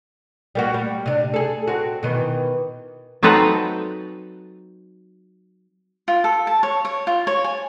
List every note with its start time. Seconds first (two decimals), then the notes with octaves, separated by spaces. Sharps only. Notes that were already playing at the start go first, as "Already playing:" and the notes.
0.55 G3 A#3 F#4
0.74 G3
1.06 C3 D4
1.34 G#4 A4
1.67 C4 F#4
2.03 B2 D#3 E3
3.23 F#3 C4 D#4 A4 B4 A#5
6.08 F4
6.24 A4
6.47 A5
6.63 C#5
6.85 C#5
7.07 F4
7.27 C#5
7.44 G#5